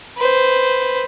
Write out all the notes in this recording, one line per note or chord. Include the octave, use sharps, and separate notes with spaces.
B4 C5